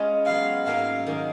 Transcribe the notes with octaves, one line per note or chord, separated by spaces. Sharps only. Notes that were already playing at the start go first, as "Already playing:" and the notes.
Already playing: G#3 C#4 F4 B4
F#3 B3 F#4 F5
G#2 F#3 A#3 C#4 F5
D#3 A#3 C#4